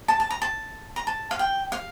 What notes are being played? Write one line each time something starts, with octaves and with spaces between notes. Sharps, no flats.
A5
A5
A#5
A5
A#5
A5
F5
G5
F5